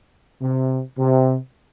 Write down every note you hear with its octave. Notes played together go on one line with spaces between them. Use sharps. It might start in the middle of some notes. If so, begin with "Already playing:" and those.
C3
C3